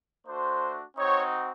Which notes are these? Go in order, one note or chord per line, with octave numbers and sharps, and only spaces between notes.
A3 D4 F#4 C5
C4 D#4 F#4 C#5